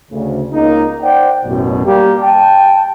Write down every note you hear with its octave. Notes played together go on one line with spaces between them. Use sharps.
D2 C#3
C#2 A#3 D#4
C5 D5 F#5 G5
A1 F#2 B2
G3 A#3 G4
G5 A5